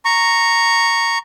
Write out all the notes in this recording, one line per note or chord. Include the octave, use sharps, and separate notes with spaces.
A#5 C#6